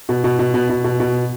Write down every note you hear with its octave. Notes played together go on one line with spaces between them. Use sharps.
B2
B2
B2
B2
B2
B2
B2